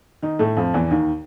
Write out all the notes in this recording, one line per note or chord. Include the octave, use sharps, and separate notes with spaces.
D#3 D#4
A2 A3
F2 F3
E2 E3
D#2 D#3